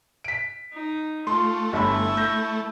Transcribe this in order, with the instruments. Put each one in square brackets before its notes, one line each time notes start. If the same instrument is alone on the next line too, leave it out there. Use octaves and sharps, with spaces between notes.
[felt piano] B6 D7
[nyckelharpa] D#4
[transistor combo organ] A3 [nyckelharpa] F4 [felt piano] C6
[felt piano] G1 B5 [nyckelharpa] E4 E5
[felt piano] G6 A#6